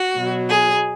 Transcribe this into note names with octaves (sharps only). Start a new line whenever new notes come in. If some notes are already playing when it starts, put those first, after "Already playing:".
Already playing: F#4
B2 F#3
G#4